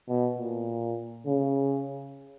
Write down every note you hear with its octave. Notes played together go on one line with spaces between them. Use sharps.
B2
A#2
C#3